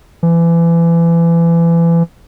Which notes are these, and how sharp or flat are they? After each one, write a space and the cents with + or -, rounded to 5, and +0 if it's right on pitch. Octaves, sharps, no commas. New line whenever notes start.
E3 +30